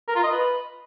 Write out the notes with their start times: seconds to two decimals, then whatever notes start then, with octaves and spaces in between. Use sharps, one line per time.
0.08 A#4
0.16 F4
0.24 D#5
0.32 B4